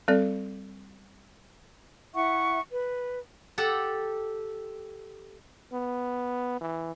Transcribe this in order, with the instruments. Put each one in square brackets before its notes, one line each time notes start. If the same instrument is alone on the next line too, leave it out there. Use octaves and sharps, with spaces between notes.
[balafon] G3 C4 A4 D5
[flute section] E4 E5 F#5 C#6
B4
[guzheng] G4 A4 F#5 G5 A5
[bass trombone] B3
E3